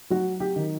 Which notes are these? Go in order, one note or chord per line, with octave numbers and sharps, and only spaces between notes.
F#3 F#4
G4
D#3